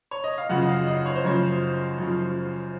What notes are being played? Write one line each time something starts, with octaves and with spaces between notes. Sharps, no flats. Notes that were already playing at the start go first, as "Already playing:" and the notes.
C#5
D#5
F5
F#2 C#3 F3 F#5
D#5
F5
D#5
C#5
C5
F#2 C#3 F3 C#5
F#2 C#3 F3